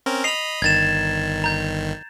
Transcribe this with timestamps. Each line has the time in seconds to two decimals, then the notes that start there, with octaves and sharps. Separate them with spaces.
0.06 C4 C#4 A#4
0.24 D#5 B5 C7 F7
0.62 G1 D#3 G#6 A6 E7
1.44 A#5 G6